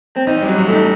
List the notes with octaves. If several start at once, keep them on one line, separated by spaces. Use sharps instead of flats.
C4
A1 D#4
F#3 G3
A1
A3
D#4